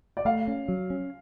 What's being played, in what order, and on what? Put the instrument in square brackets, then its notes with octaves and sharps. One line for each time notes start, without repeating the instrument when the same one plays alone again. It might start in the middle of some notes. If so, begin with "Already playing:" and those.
[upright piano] D5
[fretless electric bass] A3 [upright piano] F5
[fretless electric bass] C#4
F#3
C#4